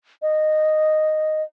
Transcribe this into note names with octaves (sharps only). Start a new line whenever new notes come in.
D#5